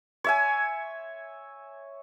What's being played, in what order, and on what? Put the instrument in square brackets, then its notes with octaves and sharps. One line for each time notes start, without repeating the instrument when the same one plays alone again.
[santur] C#5 E5 G#5